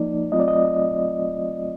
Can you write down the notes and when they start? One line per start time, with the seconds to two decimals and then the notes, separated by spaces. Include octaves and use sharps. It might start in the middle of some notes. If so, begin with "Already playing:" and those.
Already playing: F3 A#3 D#4 D5
0.31 F#3 A3 C4 F4 D#5
0.40 D5
0.48 D#5